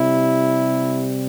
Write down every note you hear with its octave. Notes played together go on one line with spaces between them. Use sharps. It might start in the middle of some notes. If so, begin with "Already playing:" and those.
Already playing: C3 G3 E4